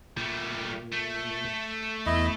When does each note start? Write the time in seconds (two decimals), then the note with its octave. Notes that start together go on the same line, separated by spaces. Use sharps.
0.17 A#2 G3 A3
0.93 A3
2.06 E2 E4 D#5